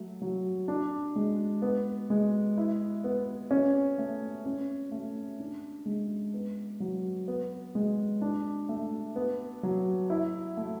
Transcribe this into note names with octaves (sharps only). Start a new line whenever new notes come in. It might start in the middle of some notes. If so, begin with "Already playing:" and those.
Already playing: F#3 A3
F#3
D4
G#3
B3
G#3
E4
B3
C#4
A3
C#4
A3
D4
G#3
B3
F#3
B3
G#3
D4
A3
B3
F#3
E4
A3